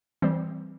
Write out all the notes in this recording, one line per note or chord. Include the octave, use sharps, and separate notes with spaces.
E3 G3 C4